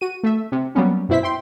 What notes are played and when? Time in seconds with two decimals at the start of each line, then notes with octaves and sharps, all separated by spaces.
0.01 F#4 D#7
0.23 A3 E5
0.52 C3
0.75 F#3 G3 A#3 B3 C#4
1.09 F#2 B2 E4 C5 E5 B6
1.23 G5 C6